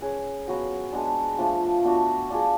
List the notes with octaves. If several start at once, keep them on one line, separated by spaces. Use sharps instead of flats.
C#4 G#4 B4
F#3 B3 F#4 B4
G#3 B3 D4
F3 A3 D4 F4
B3 D4 F#4
D4 F4 G#4